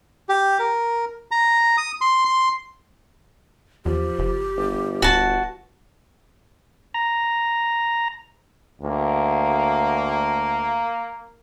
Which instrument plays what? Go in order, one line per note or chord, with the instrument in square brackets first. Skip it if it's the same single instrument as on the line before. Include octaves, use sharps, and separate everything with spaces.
[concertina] G4
A#4
A#5
D#6
C6
C6
[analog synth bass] E2 [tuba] F3 [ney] G4
[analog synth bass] F#1
[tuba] G1
[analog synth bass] D1 [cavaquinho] F#4 A5
[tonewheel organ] A#5
[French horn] D2 [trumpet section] A#3